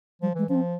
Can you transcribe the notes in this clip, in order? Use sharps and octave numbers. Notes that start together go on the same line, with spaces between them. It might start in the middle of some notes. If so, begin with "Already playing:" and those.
F3 G3
E3 G#3
F3 C#4
C4